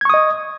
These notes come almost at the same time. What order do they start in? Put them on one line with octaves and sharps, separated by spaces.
G#6 C#6 D#6 D#5